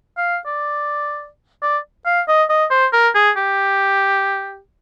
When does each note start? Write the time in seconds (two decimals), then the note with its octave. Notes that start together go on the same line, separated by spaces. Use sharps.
0.18 F5
0.46 D5
1.62 D5
2.06 F5
2.28 D#5
2.50 D#5
2.71 C5
2.93 A#4
3.15 G#4
3.37 G4